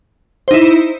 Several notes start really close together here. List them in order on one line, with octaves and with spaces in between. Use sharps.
C5 D#4 E4